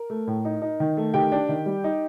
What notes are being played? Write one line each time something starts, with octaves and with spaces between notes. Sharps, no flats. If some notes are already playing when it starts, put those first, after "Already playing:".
Already playing: A#4
A3
A2
D#4
D#4
D#3
A3
D#3 G4 G5
D4
D#3
G3
D#4